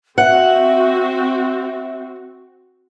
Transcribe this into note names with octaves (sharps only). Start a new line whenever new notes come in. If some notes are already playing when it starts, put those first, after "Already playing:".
C4 F#4 E5 F#5